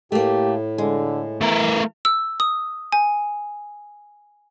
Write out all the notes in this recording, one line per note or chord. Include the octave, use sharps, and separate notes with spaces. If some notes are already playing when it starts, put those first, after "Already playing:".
A2 A3 A#3 G4
D3 G#3
E3 A3 A#4
E6
D#6
G#5